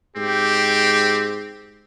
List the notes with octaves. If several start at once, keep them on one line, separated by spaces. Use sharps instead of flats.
G#2 C4 G4